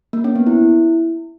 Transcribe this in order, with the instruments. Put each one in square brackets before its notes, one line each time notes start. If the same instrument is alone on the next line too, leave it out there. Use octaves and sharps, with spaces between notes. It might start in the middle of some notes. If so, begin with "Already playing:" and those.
[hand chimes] A#3
C#4
B3
E4